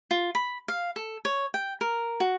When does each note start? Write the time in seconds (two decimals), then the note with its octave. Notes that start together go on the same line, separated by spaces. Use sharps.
0.11 F4
0.35 B5
0.68 F5
0.96 A4
1.25 C#5
1.54 G5
1.81 A#4
2.20 F#4